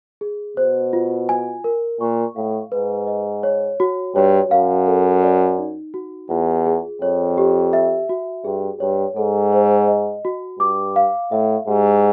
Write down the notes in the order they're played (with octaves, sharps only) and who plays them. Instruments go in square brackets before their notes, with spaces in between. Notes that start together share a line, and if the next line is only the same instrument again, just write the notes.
[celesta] G#4
[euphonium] B2 [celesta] C5
[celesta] F4
G#5
A#4
[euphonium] A#2 [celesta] C#6
[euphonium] A2 [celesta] F5
[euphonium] G#2 [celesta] B4
[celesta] D#5
C#5
F#4
[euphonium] G2 [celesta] C#5
[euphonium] F#2 [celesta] F5
[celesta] A4
D5
D#4
F#4
[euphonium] E2 [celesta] F4
[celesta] G#4
[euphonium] F2 [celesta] C#5
[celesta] G4
E5
F#4
[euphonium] G2 [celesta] G#4
[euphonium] G2 [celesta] C#5
[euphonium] G#2 [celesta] A4
[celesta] C5
D#5
F#4
[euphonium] G2 [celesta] D6
[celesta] F5
[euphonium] A2 [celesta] E5
[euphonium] G#2 [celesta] G4